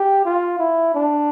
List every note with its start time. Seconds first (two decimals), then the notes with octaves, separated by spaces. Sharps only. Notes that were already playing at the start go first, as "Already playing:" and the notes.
Already playing: G4
0.25 F4
0.59 E4
0.95 D4